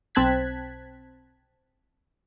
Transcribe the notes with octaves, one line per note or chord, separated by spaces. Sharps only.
B1 C4 A5 F#6 G#6 B6